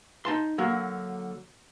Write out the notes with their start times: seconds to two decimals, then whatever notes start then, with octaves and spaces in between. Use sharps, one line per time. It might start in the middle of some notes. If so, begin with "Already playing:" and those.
0.25 D#4 A5 C6
0.58 D3 F#3 A#3